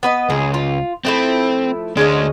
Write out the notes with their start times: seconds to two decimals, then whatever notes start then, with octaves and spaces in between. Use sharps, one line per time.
0.03 B3 B4 D#5
0.30 C#2 G#4
0.54 F4
1.05 F3 A3 C4 E4
1.97 D2 G#3 C#4 D4 D#5